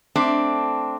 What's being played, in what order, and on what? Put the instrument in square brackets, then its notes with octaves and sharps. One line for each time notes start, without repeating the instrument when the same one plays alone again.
[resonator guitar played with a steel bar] A3 C4 D4